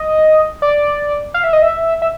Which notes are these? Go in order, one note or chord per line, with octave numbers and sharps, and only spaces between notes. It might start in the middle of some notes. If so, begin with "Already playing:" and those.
Already playing: D#5
D5
F5
E5
D#5
E5
E5